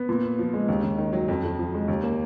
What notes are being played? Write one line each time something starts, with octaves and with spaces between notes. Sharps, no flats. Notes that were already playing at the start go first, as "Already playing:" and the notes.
Already playing: B3
A#2
B3
F3
G#3
D#2
D#2
D#3
F#3
F2
F2
F3
G#3
D#2
A#3